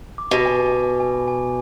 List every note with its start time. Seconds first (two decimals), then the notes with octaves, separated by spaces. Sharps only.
0.18 D6
0.31 B2
0.46 G#5
0.72 G#5
1.00 G#5
1.28 G#5